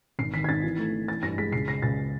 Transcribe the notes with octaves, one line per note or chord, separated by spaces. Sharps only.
G#1 C7
D#3 B6
G#6
G#1 A6
E3
A3
E3
E3 A6
G2 A#6
G#3 B6
C#2 C7
C#3 A#6
C#2 A6